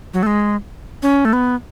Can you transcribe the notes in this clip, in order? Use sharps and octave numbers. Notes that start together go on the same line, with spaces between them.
F#3
A3
G#3
C#4
A3
B3